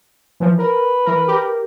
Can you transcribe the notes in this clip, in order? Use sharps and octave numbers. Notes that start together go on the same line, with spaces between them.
E3 F3
A#4 B4
E3 A#4
G4 A#4